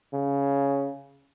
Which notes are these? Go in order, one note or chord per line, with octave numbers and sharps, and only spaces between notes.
C#3